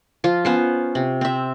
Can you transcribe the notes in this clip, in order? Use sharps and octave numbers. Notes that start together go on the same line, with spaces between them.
F3 F4
B3 C#4 C5
C3
C4 E5